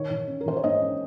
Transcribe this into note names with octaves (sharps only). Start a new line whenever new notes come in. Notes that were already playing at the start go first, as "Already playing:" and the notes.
Already playing: D#3 C#5
D#3
C#4
A#4
D#3 C5
C#5
G#2 D#5
C#4